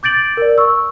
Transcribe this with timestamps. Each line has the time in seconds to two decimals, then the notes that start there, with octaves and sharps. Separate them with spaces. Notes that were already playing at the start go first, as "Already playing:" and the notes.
0.03 D6 G6 A6 D7 F#7
0.37 A#4 D5
0.58 C#6 E6